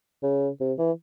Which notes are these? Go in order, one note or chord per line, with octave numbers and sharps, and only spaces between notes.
C#3
C3
E3